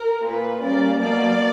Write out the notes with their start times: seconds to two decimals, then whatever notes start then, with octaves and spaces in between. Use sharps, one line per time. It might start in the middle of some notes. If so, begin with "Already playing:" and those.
Already playing: A#4
0.24 A#2 A#3 B4
0.62 C#3 G3 A#3 D5
0.99 B2 F#3 A#3 D5